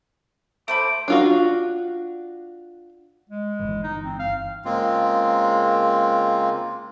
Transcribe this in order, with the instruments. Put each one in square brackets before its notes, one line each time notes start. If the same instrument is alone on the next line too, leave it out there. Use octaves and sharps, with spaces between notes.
[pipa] A3 C5 B5 [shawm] D6
[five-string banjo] D4 F4 F#4
[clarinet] G#3
[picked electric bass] G1 E3
[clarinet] D#4
C4
F5
[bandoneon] C#3 G#3 A#3 C4 F4